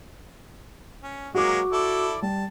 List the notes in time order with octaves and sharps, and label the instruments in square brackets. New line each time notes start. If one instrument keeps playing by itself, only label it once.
[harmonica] C#4
[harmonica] F#3 G#3 A#3 [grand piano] F#4 D6
[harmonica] E4 A4 D5
[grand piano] G3 [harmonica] A5